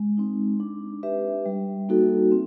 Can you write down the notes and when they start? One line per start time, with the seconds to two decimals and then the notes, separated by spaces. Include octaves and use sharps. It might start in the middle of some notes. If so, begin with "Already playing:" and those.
Already playing: G#3
0.17 C4 D#4
0.60 D4
1.03 G4 B4 E5
1.46 G3
1.89 A#3 D#4 F#4 A4
2.31 C4